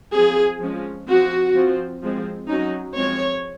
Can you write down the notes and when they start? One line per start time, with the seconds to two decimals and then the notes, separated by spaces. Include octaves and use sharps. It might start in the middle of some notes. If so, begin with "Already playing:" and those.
0.14 F3 C4 G#4
0.62 F3 G#3 C#4
1.08 F3 C4 F#4
1.55 F3 C4
2.02 F3 G#3 C4
2.49 F#3 C#4 D#4
2.95 F3 G#3 C4 C#5